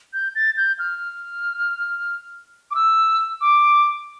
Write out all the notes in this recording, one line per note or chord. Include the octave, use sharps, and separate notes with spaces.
G6
A6
G6
F6
D6
E6
D6